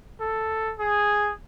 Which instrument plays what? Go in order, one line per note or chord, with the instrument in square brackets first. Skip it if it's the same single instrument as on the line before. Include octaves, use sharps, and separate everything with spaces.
[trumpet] A4
G#4